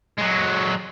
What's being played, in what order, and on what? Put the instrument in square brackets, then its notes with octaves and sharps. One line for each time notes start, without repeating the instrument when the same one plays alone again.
[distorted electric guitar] F#3 G#3